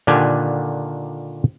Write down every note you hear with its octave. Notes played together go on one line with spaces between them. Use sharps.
A#2 D3 D#3 D4 G4 G#5